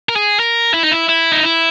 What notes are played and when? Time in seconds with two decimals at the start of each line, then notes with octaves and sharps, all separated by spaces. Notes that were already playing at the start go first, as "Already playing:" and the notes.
0.09 A#4
0.16 G#4
0.40 A#4
0.74 E4
0.83 D#4
0.92 E4
1.09 E4
1.32 D#4
1.43 E4